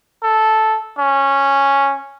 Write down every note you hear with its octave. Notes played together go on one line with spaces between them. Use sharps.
A4
C#4